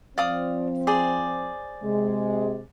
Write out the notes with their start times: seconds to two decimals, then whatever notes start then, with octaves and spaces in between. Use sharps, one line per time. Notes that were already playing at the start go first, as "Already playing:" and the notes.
0.18 F3 C4 D5 F5 D#6
0.87 G#4 C5 D5
1.83 C3 G#3